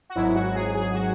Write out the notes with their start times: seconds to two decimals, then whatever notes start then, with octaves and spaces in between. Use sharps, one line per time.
0.09 F#4
0.15 G#1 G#2 F#3 E4
0.35 F#4
0.55 G#4
0.75 G#4
0.94 F#4